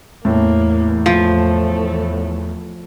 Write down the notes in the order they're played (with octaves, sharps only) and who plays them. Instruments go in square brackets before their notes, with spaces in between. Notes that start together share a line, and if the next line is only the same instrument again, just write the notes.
[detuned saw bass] E2 [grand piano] A2 [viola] A#3
[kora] F3 [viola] A3